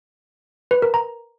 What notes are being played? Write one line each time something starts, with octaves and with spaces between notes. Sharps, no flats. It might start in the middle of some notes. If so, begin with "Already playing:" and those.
B4
A#4
A#5